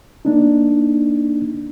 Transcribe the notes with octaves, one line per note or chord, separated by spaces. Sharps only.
A#3 D4 D#4